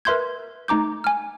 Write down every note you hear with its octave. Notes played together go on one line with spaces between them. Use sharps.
A#4 B4 E5 C6 G6 G#6
A3 D#4 A#5 D6 G6
G#5 F6